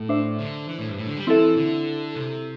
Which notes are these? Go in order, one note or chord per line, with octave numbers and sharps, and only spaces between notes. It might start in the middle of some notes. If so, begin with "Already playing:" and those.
Already playing: A2
D4 C5 E5
D3
E3
A2
G2
A2
D3
G3
E3 C4 E4 A4 E5
D3
C3